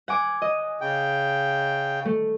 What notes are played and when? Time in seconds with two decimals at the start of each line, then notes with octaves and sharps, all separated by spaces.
0.08 F#5 G#5 D6
0.42 D#5
0.81 C#3 G5
2.05 A3